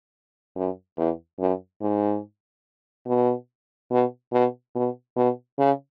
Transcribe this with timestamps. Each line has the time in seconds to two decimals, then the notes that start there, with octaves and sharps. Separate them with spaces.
0.56 F#2
0.97 E2
1.39 F#2
1.81 G#2
3.07 B2
3.91 B2
4.32 B2
4.75 B2
5.16 B2
5.58 C#3